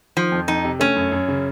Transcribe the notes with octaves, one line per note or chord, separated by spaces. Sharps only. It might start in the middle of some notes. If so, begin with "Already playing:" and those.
D#3 F3
F2
F2 D#4
C3
A3 C#4
F#2
F#2
C#3